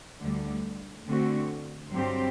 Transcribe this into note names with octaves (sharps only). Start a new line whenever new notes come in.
D2 D3 G3
D3 A3 C4 F#4
G2 F#3 C4 G4 C5